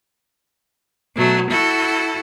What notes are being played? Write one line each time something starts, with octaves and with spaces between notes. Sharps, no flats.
B2 F#3 A3
E4 F#4 A4